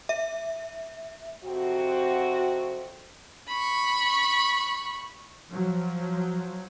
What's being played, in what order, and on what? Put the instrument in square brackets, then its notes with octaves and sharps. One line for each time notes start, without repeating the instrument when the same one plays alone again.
[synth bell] E5
[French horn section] F2 C3 C4 F#4
[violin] B5 C#6
[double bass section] F3 F#3